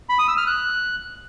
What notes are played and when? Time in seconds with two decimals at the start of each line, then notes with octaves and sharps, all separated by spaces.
0.09 B5
0.19 D#6
0.28 E6
0.37 F6
0.47 F#6